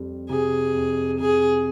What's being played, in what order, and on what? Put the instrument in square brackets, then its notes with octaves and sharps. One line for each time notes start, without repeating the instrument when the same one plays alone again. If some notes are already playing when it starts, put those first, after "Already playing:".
Already playing: [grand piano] F2 G3
[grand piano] C3 [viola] G#4
[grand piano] F2
[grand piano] C3 [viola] G#4